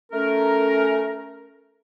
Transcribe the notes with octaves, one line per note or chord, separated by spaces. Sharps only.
A3 C#4 A#4